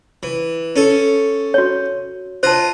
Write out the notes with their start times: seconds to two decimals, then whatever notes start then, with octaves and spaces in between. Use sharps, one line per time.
0.23 E3
0.76 C#4 A4
1.54 F#4 C#5
2.43 F4 C5 D#5 A5